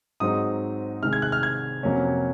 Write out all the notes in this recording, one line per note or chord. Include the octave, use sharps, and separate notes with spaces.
G#2 F#3 C4 D#4 D#6
C3 D#3 G#3 F6
G#6
F#6
F6
G#6
F2 C3 F#3 A#3 C#4